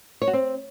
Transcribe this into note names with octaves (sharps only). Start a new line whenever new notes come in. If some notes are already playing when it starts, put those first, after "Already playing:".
C#5
F#4
C4